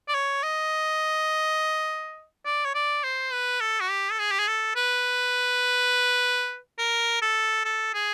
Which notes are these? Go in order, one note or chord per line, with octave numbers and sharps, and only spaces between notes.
D5
C#5
D#5
D5
C#5
D5
C5
B4
A4
F#4
G4
A4
G#4
G4
G#4
A4
B4
A#4
A4
A4
G#4